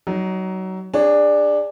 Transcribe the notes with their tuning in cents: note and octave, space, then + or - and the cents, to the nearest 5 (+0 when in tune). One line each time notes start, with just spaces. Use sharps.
F#3 +25 D#4 +0
D4 +10 G#4 -30 C#5 +0